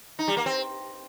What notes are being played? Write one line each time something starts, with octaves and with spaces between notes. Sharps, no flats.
D#4
G3
A#3
C4